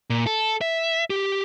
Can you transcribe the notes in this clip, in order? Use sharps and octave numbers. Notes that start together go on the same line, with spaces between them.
A#2
A4
E5
G4